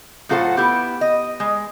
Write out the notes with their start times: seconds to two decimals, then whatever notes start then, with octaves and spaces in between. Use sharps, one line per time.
0.29 A2 F#3 F4 A4 C5 F#5
0.57 B3 E4 G4
1.01 D#5
1.40 G#3